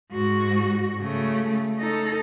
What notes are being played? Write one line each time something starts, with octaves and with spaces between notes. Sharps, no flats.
G#2 F#4
C#3 A3
D#4 A4